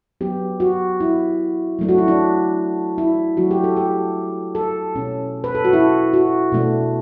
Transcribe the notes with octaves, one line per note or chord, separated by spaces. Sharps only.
F#3 B3 D4 G4
F#4
E4
F#3 A3 D4
F#4
E4
D4
E4
F#3 A3 D4 F#4
G4
A4
G4
A4
B2 A3 C#4
B4
A4
F#4
E4
F#4
B2 A3 D4